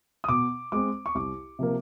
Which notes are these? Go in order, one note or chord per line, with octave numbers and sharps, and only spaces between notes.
D#6
B2 D6
G#3 C4 D6
C#6
C2 D6
C3 F3 A#3